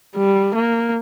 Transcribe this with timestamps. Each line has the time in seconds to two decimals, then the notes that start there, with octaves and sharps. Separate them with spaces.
0.16 G3
0.55 A#3